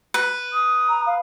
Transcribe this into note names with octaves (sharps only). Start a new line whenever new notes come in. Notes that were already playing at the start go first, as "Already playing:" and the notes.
B4
D#6
A#5
F5